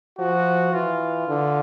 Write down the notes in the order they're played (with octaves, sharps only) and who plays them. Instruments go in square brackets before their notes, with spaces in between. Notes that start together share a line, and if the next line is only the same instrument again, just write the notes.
[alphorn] F3 [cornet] F#4
[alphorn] E3 [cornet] F4
[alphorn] D3